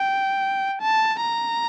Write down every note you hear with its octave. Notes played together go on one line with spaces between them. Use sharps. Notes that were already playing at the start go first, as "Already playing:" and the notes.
Already playing: G5
A5
A#5